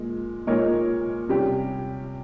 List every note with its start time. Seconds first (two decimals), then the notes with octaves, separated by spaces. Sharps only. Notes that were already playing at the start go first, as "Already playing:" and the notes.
Already playing: A#2 G#3
0.47 A#2 G#3 D#4 A#4 C#5
1.29 C3 G3 C#4 G4